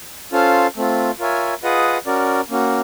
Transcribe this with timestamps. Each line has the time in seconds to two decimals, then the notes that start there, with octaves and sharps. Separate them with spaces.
0.32 C#4 F4 A4 C5 F5
0.76 A3 C4 F4
1.19 F4 A#4 C#5 E5 G#5
1.63 F4 G#4 B4 D#5 F#5
2.06 C#4 F#4 A#4 D5
2.50 A#3 C#4 F#4